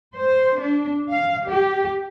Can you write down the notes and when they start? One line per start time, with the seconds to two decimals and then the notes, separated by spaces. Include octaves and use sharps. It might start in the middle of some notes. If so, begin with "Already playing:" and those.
0.17 C5
0.59 D4
1.12 F5
1.48 G4